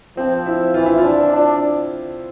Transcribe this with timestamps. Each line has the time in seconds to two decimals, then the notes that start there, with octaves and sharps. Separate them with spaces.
0.17 F3 C4
0.46 E4
0.74 E3 F4
0.86 E4
0.98 F4
1.04 D4
1.33 D4